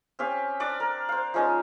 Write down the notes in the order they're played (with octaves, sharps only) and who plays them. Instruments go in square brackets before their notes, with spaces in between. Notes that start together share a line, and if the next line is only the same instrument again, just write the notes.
[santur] C4 C#4 G4 F5
D4 D5 D6
A#4
C5 F5
F3 G#3 C#4 D#4